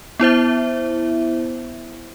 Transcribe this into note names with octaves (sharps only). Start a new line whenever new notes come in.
B3 E4 C5 E5